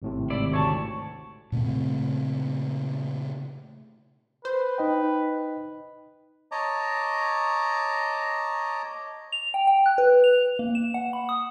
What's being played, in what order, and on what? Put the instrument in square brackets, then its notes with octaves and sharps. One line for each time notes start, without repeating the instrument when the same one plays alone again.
[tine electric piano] G#1 A2 C3
[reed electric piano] G#2 D#3 [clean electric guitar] E4 D5
[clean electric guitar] D2 C#5 A5
[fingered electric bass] A#2 C#3 A3 C4
[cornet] B4 [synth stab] C5
[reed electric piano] D#4 D#5 G5
[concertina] C#5 D#5 A5 A#5 D6
[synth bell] F7
G5
G5
F#6
B4
F7
A#3
E7
F#5
B5
D#6